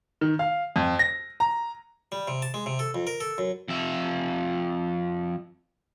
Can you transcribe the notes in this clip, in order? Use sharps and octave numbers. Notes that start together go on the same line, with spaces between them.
D#3
F5
F2
A#6
A#5
G3
C3
A5
G#3
C3
A4
F2
A#4
A4
F#2
F2 E5